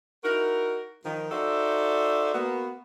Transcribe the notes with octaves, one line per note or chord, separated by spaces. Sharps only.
D#4 E4 F#4 A#4
D#3 F3
D#4 F#4 A4 C5 D5 E5
A#3 B3 F#4